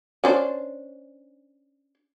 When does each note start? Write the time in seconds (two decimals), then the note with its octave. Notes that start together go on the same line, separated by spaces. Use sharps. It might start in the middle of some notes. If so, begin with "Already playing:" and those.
0.24 C#4 D4 C5